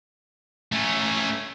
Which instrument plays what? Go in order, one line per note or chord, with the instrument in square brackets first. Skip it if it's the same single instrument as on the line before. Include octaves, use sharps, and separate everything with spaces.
[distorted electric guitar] A3 C#4